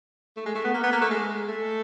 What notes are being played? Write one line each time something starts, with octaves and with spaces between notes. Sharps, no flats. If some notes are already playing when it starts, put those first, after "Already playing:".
A3
G#3
A3
B3
A#3
B3
A#3
A3
G#3
A3